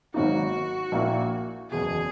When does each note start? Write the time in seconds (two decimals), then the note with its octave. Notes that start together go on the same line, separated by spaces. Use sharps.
0.14 G#1 G#2 F#3 A#3 D#4 F#4
0.92 A#1 A#2 A#3 E4
1.70 F#1 E2 B2 G#4